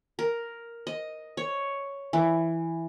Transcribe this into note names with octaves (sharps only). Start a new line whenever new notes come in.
A#4
D#5
C#5
E3